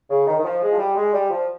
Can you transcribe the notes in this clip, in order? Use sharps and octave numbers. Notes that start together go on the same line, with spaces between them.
C#3
D#3
D#3
F3
G#3
F3
G3
G#3
G3
F3